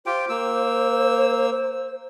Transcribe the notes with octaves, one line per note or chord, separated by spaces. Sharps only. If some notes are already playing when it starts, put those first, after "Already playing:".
F4 G4 C5 G5
A#3 E6